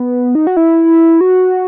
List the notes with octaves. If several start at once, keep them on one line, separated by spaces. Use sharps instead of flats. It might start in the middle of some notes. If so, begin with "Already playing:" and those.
Already playing: B3
D#4
F#4
E4
F#4